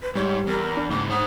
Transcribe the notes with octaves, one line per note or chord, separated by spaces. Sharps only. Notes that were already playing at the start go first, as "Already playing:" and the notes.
B4
G#2 G3 C#5
E2 A#4
D4
G#2 C#3 A#3 D6
C5 F#5 D#6